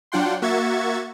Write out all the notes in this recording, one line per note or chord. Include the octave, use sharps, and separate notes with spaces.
F#3 D4 F4 F#5 G5 C6
A#3 F#4 E5 C#6 G#6 A6